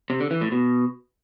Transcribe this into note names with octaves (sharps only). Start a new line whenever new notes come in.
C3
D3
E3
A2
B2